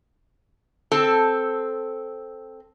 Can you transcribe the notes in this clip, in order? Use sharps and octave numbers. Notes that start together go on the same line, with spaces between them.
C4 A4